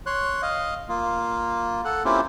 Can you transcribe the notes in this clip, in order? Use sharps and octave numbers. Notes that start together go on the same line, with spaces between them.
C#5 C6 F#6
D#5 F5
A#3 F4
A4 F#5
A#3 C4 C#4 E4 F4 G4